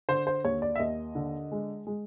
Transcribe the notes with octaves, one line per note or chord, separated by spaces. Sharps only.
D3 C5
C5
D#2 C#5
D5
E5
D#2 D#5
D3
G#3
G#3